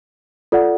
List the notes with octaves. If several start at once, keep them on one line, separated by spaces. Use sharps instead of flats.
F4 A4 D5 F#5